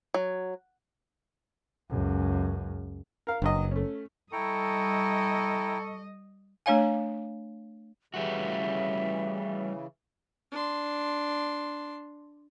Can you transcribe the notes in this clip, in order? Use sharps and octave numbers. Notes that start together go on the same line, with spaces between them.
F#3
C#2 F#2
A#4 F5
F#1 G2 F#3 D#5
A3 C#4
G3 E4 A4 D#5 G5 A#5 C#6
A3 D4 C#5 F5 G#5
C#3 E3 G3 A3 F#4 E5
D4 C6